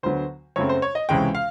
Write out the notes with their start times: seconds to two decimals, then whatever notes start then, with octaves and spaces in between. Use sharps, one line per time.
0.03 D2 D3 F#3 B3 C5
0.56 F#2 C#3 F#3 A3 C4 C#5
0.69 C5
0.82 C#5
0.95 D#5
1.09 C#2 C3 E3 G#3 C#4 G5
1.35 F5